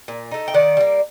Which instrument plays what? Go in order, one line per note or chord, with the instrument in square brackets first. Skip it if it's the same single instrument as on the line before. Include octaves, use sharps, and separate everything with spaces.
[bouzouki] A#2
A3 D#4
G5
D#3 D5 F#5
G3 A#3